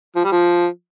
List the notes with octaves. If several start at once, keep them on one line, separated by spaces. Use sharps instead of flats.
F3
G3
F3